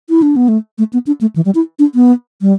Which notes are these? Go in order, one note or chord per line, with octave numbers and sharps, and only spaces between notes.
E4
D4
B3
A3
A3
B3
D4
A3
E3
G3
E4
D4
B3
G3